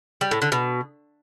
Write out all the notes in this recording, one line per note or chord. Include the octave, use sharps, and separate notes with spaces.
G3
A2
D3
B2